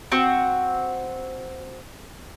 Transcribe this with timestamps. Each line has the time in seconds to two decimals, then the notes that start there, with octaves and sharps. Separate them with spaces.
0.12 C4 F#4